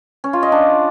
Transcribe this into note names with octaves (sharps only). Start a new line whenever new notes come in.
C#4
F4
D#5
D4